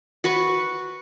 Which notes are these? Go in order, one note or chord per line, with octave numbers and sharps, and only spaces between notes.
F#4 B4 B5 C#6